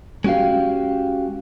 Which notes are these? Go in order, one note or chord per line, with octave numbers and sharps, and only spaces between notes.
G#3 C#4 F#4 G4 F5